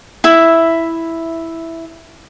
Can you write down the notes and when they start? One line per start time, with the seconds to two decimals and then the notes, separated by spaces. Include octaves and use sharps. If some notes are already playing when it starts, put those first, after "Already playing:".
0.24 E4 E5